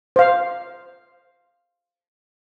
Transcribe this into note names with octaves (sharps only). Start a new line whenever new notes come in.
C5 F5